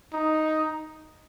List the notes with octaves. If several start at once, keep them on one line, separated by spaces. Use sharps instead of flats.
D#4